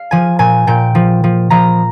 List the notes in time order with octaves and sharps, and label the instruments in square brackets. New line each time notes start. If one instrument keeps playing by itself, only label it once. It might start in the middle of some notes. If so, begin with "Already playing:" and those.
Already playing: [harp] F5
F3 G#5
A#2 G#5
A#2 G5
F3
F3
F3 A#5